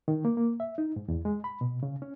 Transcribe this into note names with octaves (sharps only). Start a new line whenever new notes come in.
D#3
A#3
A#3
E5
D#4
G#2
E2
G#3
B5
B2
C#3
C#4